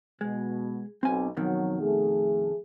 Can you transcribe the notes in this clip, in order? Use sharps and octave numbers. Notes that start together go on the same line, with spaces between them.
B2 G#3
B1 C4 G#5
F2 B2 D#3 F#3
A3 G#4